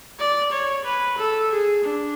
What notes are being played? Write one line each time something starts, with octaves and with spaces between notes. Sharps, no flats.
D5
C#5
B4
A4
G#4
D4